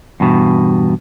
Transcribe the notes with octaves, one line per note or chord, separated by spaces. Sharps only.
E2 G2 B2